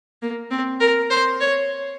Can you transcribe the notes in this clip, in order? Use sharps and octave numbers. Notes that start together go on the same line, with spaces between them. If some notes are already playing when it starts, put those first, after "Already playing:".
A#3
C4
A#4
C5
C#5